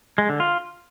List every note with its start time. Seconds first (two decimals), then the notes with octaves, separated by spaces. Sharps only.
0.18 G#3
0.29 D3
0.40 F4